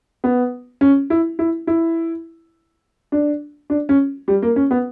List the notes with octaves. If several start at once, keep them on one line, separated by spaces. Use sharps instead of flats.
B3
C#4
E4
E4
E4
D4
D4
C#4
G3
A#3
C#4
B3